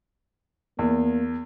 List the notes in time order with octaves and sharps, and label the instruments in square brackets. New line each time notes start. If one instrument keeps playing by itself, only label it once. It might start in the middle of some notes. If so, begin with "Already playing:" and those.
[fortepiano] E2 [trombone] A#3